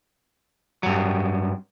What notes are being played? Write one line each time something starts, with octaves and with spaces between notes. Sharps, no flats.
G2 F#3